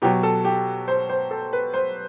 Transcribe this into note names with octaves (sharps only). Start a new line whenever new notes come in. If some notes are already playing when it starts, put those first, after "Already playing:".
B2 F#3 G4
A4
G4
C5
C5
A4
B4
C5